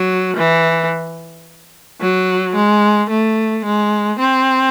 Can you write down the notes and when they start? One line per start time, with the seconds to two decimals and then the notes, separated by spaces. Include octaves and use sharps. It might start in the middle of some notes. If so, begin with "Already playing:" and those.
Already playing: F#3
0.37 E3
2.01 F#3
2.55 G#3
3.10 A3
3.65 G#3
4.19 C4